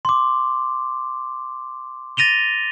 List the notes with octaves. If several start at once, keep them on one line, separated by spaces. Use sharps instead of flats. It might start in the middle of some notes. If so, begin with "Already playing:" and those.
C6 D6
A6 A#6 D#7 F7 G7